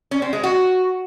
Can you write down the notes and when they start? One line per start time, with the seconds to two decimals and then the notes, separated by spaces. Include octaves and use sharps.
0.11 C#4
0.22 C4
0.33 G#3
0.43 F#4